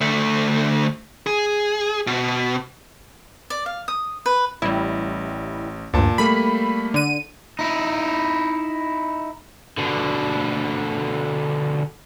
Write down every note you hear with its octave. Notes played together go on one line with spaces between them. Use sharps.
D2 A3
G#4
B2
D5
F5
D#6
B4
A1 G3 E4
D2 G2 A#2 A5
G3 A3 A#3 B5
D3 D#7
D#4 E4
B2 D3